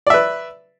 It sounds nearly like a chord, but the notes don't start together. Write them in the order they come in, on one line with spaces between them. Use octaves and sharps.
D5 E5 B4